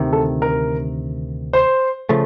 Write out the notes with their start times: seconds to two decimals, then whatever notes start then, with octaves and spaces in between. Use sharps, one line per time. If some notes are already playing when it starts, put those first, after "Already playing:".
Already playing: D2 C3 D#3
0.13 A4
0.42 A#4
1.53 C5
2.09 C#3 F3 A3